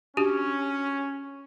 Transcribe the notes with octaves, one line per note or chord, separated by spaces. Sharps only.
C#4 D4 F#4 G4